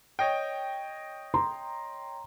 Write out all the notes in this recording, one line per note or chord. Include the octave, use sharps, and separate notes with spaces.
C#5 D#5 G5
A#5 C6